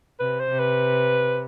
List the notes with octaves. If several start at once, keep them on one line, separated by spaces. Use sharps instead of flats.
C3 B4
C5
C3
B4